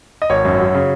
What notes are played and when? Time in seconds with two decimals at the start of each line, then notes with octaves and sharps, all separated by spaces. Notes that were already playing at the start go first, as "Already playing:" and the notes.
0.22 D#5
0.30 G#1 C#5
0.45 F#2
0.59 F#3
0.74 C#3